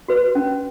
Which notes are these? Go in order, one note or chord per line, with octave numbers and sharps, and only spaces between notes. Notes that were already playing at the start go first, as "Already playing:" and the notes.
F#4 B4
C#4